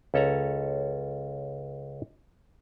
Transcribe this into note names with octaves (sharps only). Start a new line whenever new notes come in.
C#2 C#4 A4 C#5 A#5